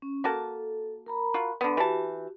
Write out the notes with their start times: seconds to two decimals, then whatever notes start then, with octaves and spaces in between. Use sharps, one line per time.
0.02 C#4
0.24 A#3 F#4 A4 A5
1.06 A#4 A#5 B5
1.34 F4 F#4
1.61 D3 B3
1.77 E3 F#4 G4 A5